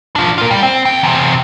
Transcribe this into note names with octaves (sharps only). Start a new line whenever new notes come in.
D4 F4
F4 A#4
G3
C4
D#2 G5
E2 C3